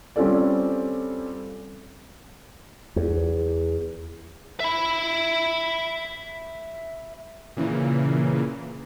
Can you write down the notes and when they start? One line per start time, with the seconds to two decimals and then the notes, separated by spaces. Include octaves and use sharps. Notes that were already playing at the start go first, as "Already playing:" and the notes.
0.16 G3 C4 C#4 F4 A4 D5
2.96 E2
4.60 E5 B5
7.57 A#2 C#3 E3 A#3